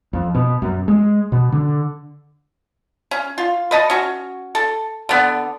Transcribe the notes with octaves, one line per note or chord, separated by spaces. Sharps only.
F2
B2
F#2
G#3
B2
D3
C#4
F4
B4 D#5 A5
C#4 F#4
A4
D3 B3